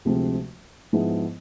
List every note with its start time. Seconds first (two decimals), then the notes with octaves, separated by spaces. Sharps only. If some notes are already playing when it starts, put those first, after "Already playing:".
0.05 D2 C3 F3 G#3 C4
0.93 G#2 F3 B3 E4 G#4